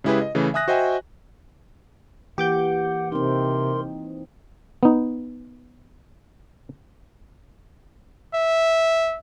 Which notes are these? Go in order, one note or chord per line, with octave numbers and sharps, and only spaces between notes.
C#3 G#3 E4 G4 G#4 B4
D#5
C#3 E3 A3
E5 G#5 D#6 F#6 A#6
F#4 C5 D#5 E5 G5 G#5
E3 A#3 G4 F#5 D6 G6
C3 C4 D#4 A#4 C6
B3 D#4
E5